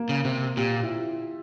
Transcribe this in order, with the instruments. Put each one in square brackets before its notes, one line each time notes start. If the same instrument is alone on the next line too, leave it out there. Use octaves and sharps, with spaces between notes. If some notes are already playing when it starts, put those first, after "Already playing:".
Already playing: [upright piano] A#3
[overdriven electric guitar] C#3
[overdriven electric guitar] C3 [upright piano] C4
[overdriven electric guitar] A#2 [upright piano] G4
[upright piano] E4
F4